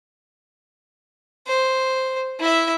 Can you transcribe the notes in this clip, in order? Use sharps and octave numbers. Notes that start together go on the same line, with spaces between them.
C5
E4 E5